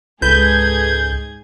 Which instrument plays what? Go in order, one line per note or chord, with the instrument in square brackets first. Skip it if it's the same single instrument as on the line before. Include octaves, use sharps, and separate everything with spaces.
[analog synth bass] C#2 [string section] G#2 G#4 G#6 [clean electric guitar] A4 B4 [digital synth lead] G6